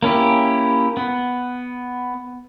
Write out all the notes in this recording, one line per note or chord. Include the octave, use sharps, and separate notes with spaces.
A#3 C#4 E4 G4
B3